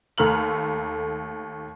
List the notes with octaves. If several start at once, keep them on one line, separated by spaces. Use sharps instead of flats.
D#2 A3 A#5 F6 F#7